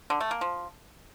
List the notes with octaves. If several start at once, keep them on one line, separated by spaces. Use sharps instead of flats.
D3
A3
A#3
F3